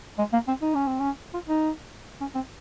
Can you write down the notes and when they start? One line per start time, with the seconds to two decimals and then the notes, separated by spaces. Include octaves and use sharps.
0.18 G#3
0.33 A#3
0.48 C4
0.62 D#4
0.74 C#4
0.87 C4
1.00 C#4
1.34 F4
1.48 D#4
2.21 C#4
2.35 C4